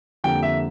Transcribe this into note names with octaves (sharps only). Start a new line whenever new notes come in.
F2 D3 G3 A#3 G5
E5